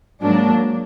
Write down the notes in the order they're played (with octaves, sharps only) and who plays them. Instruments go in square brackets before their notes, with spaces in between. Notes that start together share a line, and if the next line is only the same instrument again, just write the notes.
[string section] G#2 F#3 A#3 D4